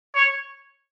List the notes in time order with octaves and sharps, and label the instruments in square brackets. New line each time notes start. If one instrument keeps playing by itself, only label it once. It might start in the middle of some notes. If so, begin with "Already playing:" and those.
[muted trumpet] C#5